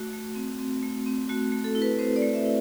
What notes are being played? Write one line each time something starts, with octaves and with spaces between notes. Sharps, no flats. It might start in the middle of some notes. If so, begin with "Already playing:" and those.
Already playing: A3 F#4
A3
C4
C4
A3
C4
A3 F#4
A3
A4
E4
B4
C4 C5
D5
A3
E5
E4